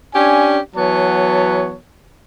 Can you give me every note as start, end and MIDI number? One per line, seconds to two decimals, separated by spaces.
0.15 0.59 61
0.15 0.59 62
0.15 0.59 67
0.15 0.59 80
0.76 1.76 52
0.76 1.76 54
0.76 1.76 59
0.76 1.76 73
0.76 1.76 81